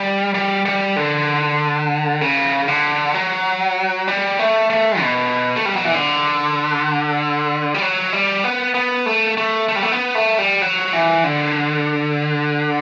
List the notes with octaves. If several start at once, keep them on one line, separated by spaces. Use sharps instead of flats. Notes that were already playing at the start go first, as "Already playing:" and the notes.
Already playing: G3
G3
G3
D3
C#3
D3
F#3
G3
A3
A3
B2
A3
G3
F#3
E3
D3
G3
F#3
G3
B3
B3
A3
A3
A3
G3
A3
B3
A3
G3
F#3
E3
D3